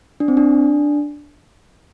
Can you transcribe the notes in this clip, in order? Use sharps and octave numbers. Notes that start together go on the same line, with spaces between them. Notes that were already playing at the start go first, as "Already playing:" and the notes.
D4
C4
D4